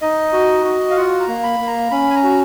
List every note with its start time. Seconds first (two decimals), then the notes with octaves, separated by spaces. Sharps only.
0.01 D#4 D#5
0.33 F#4
0.64 F#4
0.90 F5
0.97 F4 F#5
1.20 A#5
1.28 A#3
1.43 B5
1.60 A#3
1.67 A#5
1.91 C#4 B5
2.10 G#5
2.15 A#5
2.23 F#4